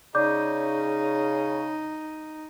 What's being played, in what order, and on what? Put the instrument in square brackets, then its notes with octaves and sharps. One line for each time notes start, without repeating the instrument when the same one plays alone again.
[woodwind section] C#3 [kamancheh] D#4 [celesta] D5 D6 G6